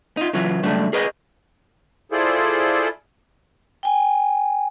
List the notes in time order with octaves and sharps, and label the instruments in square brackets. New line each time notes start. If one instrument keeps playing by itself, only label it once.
[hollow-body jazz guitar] D#4 F4
C#3 E3 F#3 F4
C#2 F#3 G3 A3 D4
G#4 A#4 B4 C#5 D#5
[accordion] E4 F4 G#4 A4 C5 D5
[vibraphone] G5 G#5